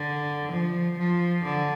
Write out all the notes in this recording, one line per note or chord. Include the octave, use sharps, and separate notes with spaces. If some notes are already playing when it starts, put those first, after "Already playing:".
Already playing: D3
F3
F3
D3